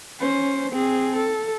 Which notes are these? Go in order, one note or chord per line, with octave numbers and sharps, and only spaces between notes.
C#4 C5
C4 G#4
A4